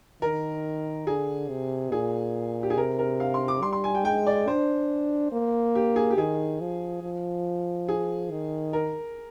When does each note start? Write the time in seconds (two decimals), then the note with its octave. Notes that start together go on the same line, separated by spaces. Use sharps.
0.22 D#3 A#4
1.06 D3 G#4
1.49 C3
1.92 A#2 G#4
2.63 G4
2.70 G#4
2.77 C3 A#4
2.99 A#4
3.20 F5
3.34 C6
3.48 D6
3.63 G3 C6
3.73 C6
3.84 G#5
3.95 G5
4.05 G#3 G5
4.27 D5
4.48 D4 C5
5.32 A#3
5.75 G4
5.96 G#4
6.10 G4
6.17 D#3 G#4
6.60 F3
7.03 F3
7.88 G#4
8.30 D#3
8.73 A#4